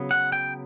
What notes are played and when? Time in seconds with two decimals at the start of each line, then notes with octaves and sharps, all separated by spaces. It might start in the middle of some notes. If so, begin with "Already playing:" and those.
Already playing: C#3 F#3 B3
0.11 F#5
0.32 G5